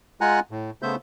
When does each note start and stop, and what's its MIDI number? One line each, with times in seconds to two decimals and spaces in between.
0.21 0.40 56
0.21 0.40 65
0.21 0.40 78
0.21 0.40 80
0.21 0.40 82
0.21 0.40 90
0.51 0.70 45
0.82 0.95 49
0.82 0.95 57
0.82 0.95 59
0.82 0.95 72
0.82 0.95 76
0.82 0.95 91